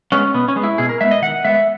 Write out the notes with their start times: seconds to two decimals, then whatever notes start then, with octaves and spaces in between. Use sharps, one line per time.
0.12 G#3 B3 C#4
0.34 B2 B3
0.48 C#4
0.56 G#3 B3
0.64 E4
0.78 B2 G#4
0.89 A#4
1.01 G#3 B3 E5
1.11 D#5
1.22 D#3 F#5
1.45 G#3 B3 E5